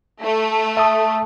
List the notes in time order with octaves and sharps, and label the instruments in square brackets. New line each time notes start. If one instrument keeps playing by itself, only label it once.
[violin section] A3
[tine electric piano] E5 A5 D#6